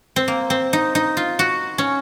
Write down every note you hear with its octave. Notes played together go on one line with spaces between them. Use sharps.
C4
A#3
C4
D#4
D#4
F4
F#4
C#4